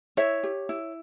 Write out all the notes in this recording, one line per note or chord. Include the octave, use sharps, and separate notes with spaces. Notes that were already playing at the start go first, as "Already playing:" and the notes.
E4 C#5 E5
G4
E4